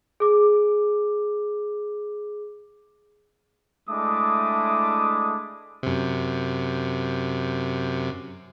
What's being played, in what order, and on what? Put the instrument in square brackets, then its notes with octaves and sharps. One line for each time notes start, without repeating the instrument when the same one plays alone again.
[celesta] G#4 D6
[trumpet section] G#3 A3 D4 E4 D6 D#6
[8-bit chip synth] F#2 C3